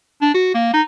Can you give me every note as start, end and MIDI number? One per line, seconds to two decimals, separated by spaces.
0.22 0.31 62
0.34 0.51 66
0.54 0.73 58
0.73 0.81 63